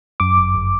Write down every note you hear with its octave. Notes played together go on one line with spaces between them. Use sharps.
F#2 D6
G1
G1